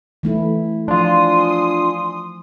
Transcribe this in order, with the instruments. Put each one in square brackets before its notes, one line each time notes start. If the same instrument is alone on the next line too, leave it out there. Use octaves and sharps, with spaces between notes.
[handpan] E3 A3 E4
[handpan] F3 [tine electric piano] D4 F4 [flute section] G#5 C6 D#6